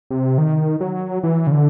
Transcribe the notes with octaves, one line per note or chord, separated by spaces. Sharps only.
C3
D#3
F#3
E3
C#3
D3